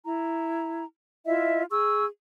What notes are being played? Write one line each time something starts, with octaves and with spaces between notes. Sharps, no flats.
E4 A#5
E4 F4 D#5 E5
G#4 C#6 E6